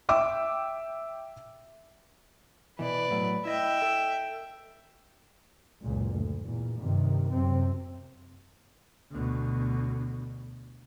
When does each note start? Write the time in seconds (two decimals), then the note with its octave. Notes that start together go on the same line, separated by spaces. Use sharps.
0.09 E5 G5 D6 E6
2.79 B2 E3 B4 D5
3.11 A2 F#3
3.45 E4 D#5 E5 G5
3.82 A4
5.82 F#1 C#2 A#2
6.14 D2
6.47 E2 A#2
6.80 G2 C3 D#3
7.32 F#2 C3 C4
9.11 D2 B2